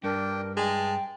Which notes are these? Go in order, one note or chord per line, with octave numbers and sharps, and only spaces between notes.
G2 D4 A#4 G5
G#3 G5 A5